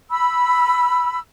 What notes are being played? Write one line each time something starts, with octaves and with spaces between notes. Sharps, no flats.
B5 E6